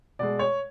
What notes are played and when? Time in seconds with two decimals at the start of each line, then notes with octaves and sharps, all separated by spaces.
0.19 B2 G#3 D5
0.39 C#5